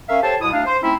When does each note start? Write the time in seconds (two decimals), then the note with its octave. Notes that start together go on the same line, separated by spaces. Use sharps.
0.08 C#4 A#4 E5 F5
0.23 G4 A4 C5 C#5 A5
0.41 C2 B2 E4 D#6
0.52 D2 D4 F5
0.65 C5
0.82 A3 C4 C#4 D#4 E4